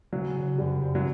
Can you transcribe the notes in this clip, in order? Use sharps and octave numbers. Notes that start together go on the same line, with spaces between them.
C#3 F#3
C#3
F#2 G3
F#2
F#3